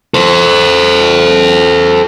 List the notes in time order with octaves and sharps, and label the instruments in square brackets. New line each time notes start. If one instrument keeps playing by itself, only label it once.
[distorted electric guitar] A4 C5